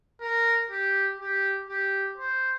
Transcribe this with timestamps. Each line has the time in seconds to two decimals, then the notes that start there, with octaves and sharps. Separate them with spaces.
0.21 A#4
0.70 G4
1.19 G4
1.69 G4
2.18 C5